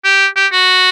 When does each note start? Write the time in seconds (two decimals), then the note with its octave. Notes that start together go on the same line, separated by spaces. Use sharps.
0.05 G4
0.36 G4
0.52 F#4